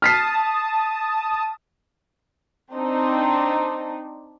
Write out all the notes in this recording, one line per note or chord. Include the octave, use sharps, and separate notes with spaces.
A5 D#6 F6 B6 C7
C4 D4 D#4